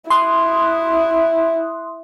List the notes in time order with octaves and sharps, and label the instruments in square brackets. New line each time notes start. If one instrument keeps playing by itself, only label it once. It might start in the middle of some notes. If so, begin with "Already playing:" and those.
[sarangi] E4 [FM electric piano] C6 D#6 F#6